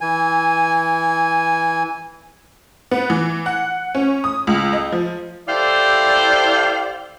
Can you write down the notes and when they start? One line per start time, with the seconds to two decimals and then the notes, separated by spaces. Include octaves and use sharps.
0.01 E3 G#5
2.91 B3
3.10 E3
3.46 F#5
3.95 C#4
4.24 D#6
4.47 C#2
4.73 D#5
4.92 F3
5.48 E4 G4 A4 C5 D5 F5